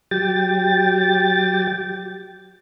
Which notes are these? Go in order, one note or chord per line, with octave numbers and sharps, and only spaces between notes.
F#3 G4 G5 A6